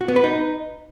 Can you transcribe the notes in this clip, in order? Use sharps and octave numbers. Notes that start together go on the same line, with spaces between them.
F#4
B3
B4
D#4